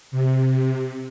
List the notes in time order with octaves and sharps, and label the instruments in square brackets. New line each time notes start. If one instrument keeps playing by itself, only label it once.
[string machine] C3